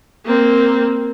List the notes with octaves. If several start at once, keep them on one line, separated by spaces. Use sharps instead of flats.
A#3 C4